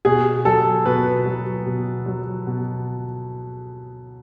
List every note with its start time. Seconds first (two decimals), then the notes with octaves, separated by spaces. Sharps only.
0.05 B2 G#4
0.45 F#3 A4
0.86 B2 B4
1.26 F#3
1.66 B2
2.06 F#3
2.47 B2